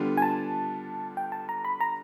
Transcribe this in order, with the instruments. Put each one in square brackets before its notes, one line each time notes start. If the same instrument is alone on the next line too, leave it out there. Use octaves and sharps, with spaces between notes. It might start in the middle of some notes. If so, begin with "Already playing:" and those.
Already playing: [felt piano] D3 G3 B3 D4 F4
[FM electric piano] G#5
A5
G5
A5
A#5
B5
A#5